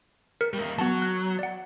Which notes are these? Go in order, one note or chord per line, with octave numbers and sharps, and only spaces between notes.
A#4 C#7
G3 A#3
F#3 B3 A5
F#6
D5 F#5